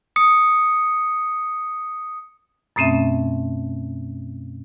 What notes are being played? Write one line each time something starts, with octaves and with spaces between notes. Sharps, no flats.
D#6 C#7
F#2 B2 A3 C4 C#4 E5